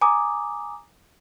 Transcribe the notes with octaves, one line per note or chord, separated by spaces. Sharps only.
G#5 A#5 D6 D#6